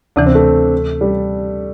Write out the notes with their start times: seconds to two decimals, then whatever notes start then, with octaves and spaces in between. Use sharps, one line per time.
0.16 D2 C3 E3 D4
0.26 C4
0.35 A3
1.01 G3